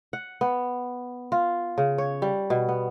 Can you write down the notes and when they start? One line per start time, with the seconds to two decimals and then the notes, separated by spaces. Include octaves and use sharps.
0.13 F#5
0.41 B3
1.32 F4
1.78 C#3
1.98 C#5
2.22 G3
2.50 B2
2.69 B3